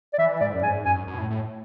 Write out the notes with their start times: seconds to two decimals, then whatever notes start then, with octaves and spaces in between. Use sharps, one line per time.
0.13 D5
0.18 E3 E5
0.40 G#2 D5
0.53 F#2
0.63 G#2 G#5
0.85 F#2 G#5
1.07 F#2
1.14 B2
1.18 A2
1.30 A2